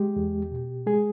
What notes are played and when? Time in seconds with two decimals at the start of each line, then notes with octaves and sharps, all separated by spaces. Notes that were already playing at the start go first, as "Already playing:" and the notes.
Already playing: G#3 G4
0.16 E2
0.52 B2
0.87 G#3 G#4